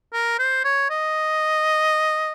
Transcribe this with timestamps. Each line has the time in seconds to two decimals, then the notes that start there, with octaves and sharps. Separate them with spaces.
0.13 A#4
0.39 C5
0.64 C#5
0.90 D#5